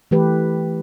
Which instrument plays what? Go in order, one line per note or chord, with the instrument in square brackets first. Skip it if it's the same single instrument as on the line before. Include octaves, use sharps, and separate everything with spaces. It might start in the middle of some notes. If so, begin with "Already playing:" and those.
[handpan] E3 A3 G4 B4